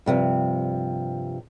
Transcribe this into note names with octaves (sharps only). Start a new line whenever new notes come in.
G2 C3 D#3 F3